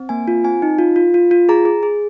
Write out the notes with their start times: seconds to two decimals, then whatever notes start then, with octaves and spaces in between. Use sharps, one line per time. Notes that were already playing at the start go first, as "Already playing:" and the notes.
Already playing: C4
0.09 A#3 G#5
0.28 F4
0.44 C4 G#5
0.62 D#4
0.79 F4
0.96 F4
1.14 F4
1.31 F4
1.49 G#4 A#5
1.65 G#4
1.83 G#4